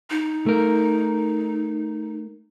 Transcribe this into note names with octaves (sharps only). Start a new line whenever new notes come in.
D#4
A3 A#4